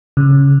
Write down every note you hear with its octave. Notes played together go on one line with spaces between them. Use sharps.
C#3